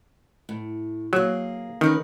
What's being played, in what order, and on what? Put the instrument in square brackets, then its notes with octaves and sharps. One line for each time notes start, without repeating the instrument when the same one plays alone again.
[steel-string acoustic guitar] A2
[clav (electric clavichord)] F#3 [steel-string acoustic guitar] A#3 G#4
[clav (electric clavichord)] D#3 [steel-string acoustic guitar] C#4 A#4 B4